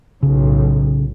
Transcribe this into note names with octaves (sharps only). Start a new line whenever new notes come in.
B1 A2 C#3